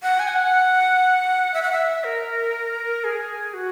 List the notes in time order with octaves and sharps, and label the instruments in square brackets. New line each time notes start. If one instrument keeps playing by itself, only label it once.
[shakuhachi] F#5
G#5
F#5
E5
F#5
E5
A#4
G#4
F#4